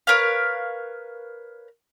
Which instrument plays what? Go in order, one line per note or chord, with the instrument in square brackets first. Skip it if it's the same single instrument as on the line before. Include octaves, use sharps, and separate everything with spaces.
[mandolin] A#4 B4 C#5 F5